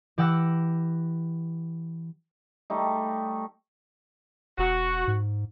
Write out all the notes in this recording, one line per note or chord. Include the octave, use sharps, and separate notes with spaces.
E3 G4 F#5 E6 F#6 A#6
G3 A3 D#4
E1 F#4
G#2